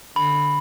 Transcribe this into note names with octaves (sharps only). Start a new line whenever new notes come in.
D3 B5